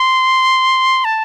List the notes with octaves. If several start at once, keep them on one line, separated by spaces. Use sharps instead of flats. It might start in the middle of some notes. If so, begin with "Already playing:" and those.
Already playing: C6
A5